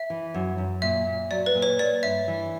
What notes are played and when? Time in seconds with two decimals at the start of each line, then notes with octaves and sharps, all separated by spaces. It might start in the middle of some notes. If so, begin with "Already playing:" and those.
Already playing: E5
0.10 E3
0.34 F#2
0.58 F#2
0.82 A#2 E5
1.07 A#2
1.31 F#3 D5
1.46 B4
1.55 A#2
1.62 C#5
1.79 A#3 D5
2.03 G2 E5
2.28 E3